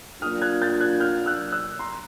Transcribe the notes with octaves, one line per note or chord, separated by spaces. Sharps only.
F#3 A#3 D4 F4 D#6 F6
F#6 G#6
G6 A6
F#6 G#6
F6 G6
E6 F#6
E6 F#6
A#5 C6